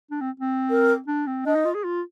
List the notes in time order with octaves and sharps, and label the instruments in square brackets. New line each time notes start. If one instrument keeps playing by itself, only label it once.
[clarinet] D4
C4
C4
[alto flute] A#4
[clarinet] D4
C4
[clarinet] D4 [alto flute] D#5
[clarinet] D#4
F4
G#4
F4